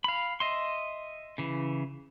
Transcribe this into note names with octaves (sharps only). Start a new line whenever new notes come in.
F5 B5
D#5 E5 C6
C#3 E3